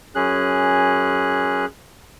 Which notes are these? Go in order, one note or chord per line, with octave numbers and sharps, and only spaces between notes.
F#2 C#4 G#4 F#6